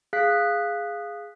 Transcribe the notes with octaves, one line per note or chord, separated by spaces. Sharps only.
G#4 F5 F#6 B6